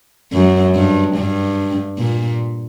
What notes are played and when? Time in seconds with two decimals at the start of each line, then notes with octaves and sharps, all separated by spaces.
0.33 F#2
0.75 G2
1.16 G2
1.99 A#2